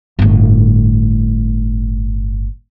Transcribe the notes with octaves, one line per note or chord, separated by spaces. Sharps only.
G1 A2